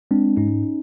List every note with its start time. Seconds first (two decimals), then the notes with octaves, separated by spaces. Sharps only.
0.11 G#3 C4 D4
0.37 G#2 C#4 D#4